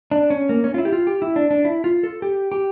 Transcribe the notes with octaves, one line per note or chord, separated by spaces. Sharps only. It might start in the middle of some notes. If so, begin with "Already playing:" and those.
D4
C#4
A#3
C#4
F4
E4
G4
F4
G4
E4
D4
D4
E4
F4
A4
G4
G4